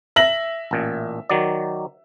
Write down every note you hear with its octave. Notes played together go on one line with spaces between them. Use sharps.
E5 A#6 F#7
A1 A#2
D#3 F#3 D5